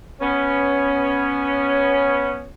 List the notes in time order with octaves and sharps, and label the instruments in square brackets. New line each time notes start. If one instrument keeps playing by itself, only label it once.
[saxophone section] B3 C#4